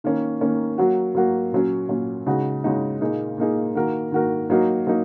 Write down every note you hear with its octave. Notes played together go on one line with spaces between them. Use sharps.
D#3 A#3 C#4
D#3 A#3 C#4
F#3 A#3 F#4
F#3 A#3 F#4
A#2 F#3 C#4
A#2 F#3 C#4
C#3 G#3 D#4 F#4
C#3 G#3 D#4 F#4
A#2 A#3 D#4 G#4
A#2 A#3 D#4 G#4
D#3 A#3 F#4 A#4
D#3 A#3 F#4 A#4
F#3 A#3 D#4 F#4 A#4
F#3 A#3 D#4 F#4